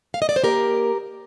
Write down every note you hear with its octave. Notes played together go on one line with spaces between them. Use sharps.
F5
D#5
D5
C5
A#3 G4 A#4